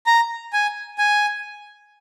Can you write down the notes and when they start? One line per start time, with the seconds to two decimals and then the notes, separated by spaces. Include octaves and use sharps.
0.07 A#5
0.53 G#5
0.98 G#5